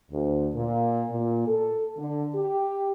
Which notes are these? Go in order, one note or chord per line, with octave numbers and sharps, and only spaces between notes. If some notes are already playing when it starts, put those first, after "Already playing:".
D2
A#2
A#2
A4
D3
G4